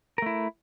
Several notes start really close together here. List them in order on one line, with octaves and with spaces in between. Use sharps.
A#4 A3 E4